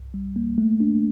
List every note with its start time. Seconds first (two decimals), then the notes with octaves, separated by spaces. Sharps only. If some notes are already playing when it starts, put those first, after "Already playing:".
Already playing: C2
0.14 G3
0.36 A#3
0.58 A3
0.80 D4